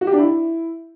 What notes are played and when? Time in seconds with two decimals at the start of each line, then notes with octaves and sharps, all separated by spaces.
0.01 F#4
0.07 G4
0.13 D4
0.19 E4